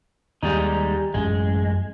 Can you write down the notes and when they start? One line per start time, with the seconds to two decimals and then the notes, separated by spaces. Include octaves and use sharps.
0.43 D#2 G3 G#3 D#4
1.14 A1 F#2 G#3 C#4